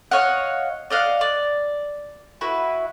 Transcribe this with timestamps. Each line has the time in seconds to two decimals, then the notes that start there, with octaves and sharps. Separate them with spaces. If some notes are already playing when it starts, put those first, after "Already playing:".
0.11 C#5 D#5 F5 F#5
0.90 D5 D#5 F5 F#5
1.21 D5
2.41 E4 F#4 B4